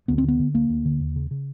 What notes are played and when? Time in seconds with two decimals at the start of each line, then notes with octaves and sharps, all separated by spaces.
0.08 D2 B3
0.18 C4
0.24 D3 B3
0.39 D3
0.54 D2 A#3
0.70 D2
0.85 D3
1.01 D#2
1.16 C#3
1.31 C#3